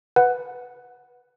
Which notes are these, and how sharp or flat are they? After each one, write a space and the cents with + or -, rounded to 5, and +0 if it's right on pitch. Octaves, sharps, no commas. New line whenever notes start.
B4 +0 F#5 -10